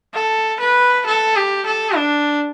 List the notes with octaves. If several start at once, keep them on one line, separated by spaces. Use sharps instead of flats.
A4
B4
A4
G4
A4
D4